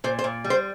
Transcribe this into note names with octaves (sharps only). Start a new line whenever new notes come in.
A#2 C5
C5
A#2
G3
C5